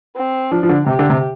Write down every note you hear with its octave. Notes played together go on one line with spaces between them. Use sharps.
C4
F3 D4
F3
D3
C3 G4
D3
C3